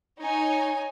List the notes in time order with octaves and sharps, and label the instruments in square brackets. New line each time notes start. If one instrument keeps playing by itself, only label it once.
[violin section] D#4 C#5 G#5